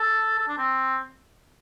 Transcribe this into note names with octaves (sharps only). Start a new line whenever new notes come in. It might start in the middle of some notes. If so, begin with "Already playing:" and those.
Already playing: A4
A4
D4
C4